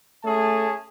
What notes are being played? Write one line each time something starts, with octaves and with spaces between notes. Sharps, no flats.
A3 C#4 G#4 A5